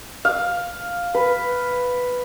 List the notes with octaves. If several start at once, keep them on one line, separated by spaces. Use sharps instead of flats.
F5
B4